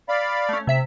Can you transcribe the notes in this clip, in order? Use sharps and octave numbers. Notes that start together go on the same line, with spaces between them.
D5 F5 B5
A3 C#4
C3 E5 B6